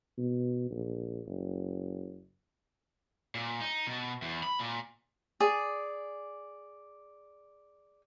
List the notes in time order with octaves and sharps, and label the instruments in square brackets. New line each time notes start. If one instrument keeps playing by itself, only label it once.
[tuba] B2
A#1
F#1
[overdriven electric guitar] A#2
D#4
B2
E2
B5
A#2
[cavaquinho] G#4 D5